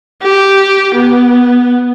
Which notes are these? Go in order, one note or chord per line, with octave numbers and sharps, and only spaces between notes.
G4
B3